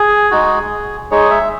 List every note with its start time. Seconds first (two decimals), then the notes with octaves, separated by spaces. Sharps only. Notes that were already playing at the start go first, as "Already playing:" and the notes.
Already playing: G#4
0.31 G#3 D#4 F#4
1.11 G#3 D#4 G#4 C#5
1.31 E5